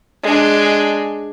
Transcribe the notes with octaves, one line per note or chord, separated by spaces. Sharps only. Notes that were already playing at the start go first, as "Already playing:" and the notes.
G#3 D4